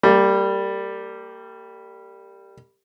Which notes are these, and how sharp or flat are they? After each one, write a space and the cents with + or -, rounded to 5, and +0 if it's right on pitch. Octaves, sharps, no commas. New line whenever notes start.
G3 +0 A#3 -35